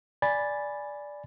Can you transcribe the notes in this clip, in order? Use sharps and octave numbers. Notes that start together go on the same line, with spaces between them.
D5 G#5 B5 A6